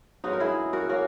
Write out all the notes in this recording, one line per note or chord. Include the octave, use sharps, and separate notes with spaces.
B2 G#3 C#4 D#4 F#4
A#4
E4 G#4
F#4 A#4
A#3 C#4 F#4 A#4